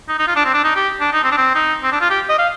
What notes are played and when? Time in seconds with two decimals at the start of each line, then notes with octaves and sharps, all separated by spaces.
0.09 D#4
0.19 D#4
0.27 F4
0.36 D4
0.45 C4
0.54 D4
0.64 D#4
0.76 G4
1.00 D4
1.13 D#4
1.24 C4
1.32 D4
1.37 C4
1.55 D#4
1.83 C4
1.92 D4
2.01 F4
2.10 G4
2.29 D#5
2.38 F5